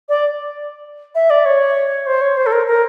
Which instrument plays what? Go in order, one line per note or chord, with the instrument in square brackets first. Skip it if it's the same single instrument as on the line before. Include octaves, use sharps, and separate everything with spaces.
[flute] D5
E5
D5
C#5
C5
C#5
C5
A4
A#4
A#4